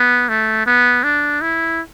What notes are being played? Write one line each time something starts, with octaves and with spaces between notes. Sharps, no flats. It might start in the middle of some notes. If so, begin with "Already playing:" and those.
Already playing: B3
A3
B3
D4
E4